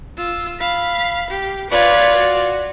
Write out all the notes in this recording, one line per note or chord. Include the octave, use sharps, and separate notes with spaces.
F4 E6
F5 B5
G4
F4 B4 C#5 D5
F#4